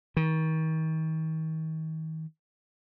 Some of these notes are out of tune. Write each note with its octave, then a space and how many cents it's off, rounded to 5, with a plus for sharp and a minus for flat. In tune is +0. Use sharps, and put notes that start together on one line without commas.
D#3 +35